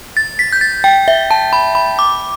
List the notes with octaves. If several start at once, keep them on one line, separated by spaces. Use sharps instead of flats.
A6
B6
G6
A6
G5
E5
A5
B5
B5
D6